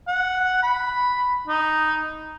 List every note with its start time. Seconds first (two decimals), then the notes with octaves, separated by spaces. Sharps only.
0.08 F#5
0.63 B5
1.47 D#4